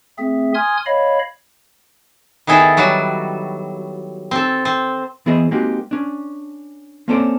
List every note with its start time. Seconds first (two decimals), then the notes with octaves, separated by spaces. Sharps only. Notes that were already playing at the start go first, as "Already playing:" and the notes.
0.18 A3 C4 G#4 E5
0.54 G#5 C6 D#6 F6 G#6
0.86 C#5 D#5 F5 B5
2.47 D#3 B3 E4 G#4 A4
2.77 F#3 G3 F#4
4.31 C4 A4
4.65 C4
5.26 E3 B3 E4 G#4 C5 D#5
5.51 G#3 A#3 C4 D#4 F#4 G4
5.91 C#4 D4
7.08 A#3 C4 C#4 A4 C5 D5